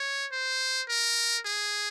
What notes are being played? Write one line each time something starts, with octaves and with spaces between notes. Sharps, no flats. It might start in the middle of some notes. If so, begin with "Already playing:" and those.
Already playing: C#5
C5
A#4
G#4